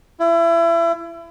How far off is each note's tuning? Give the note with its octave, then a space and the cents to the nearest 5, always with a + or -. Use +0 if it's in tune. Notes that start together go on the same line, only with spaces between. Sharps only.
E4 +30